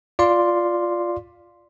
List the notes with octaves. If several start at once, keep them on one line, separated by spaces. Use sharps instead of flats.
F4 D5 F5 C6